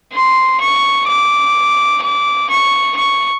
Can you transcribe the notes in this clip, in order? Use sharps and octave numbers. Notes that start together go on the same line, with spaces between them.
C6
C#6
D6
D6
C#6
C#6